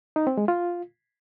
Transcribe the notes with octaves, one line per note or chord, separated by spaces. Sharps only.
D#4
C4
G#3
F4